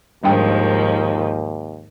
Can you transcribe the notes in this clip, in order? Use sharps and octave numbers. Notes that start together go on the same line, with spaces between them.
D#2 G#2 D#3 F3 G3 D4 G5